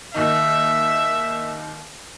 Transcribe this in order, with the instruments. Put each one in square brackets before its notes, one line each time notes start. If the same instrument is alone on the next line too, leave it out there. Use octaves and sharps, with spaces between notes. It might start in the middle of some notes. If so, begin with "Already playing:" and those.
[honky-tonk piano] D#2 D#3 D#4 [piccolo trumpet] E5